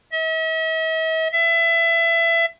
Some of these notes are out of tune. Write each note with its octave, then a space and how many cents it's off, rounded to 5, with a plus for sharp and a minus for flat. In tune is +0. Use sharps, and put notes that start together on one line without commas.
E5 -45
E5 +25